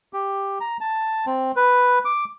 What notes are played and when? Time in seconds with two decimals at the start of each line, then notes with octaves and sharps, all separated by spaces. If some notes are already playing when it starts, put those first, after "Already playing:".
0.13 G4
0.60 A#5
0.81 A5
1.26 C4
1.56 B4
2.05 D6